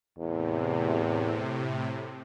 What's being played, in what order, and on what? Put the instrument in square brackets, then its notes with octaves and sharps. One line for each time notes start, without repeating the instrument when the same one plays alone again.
[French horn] E2 [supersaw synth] A2 C3